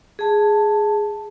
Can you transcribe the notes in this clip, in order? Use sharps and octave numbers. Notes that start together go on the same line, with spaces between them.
G#4 A5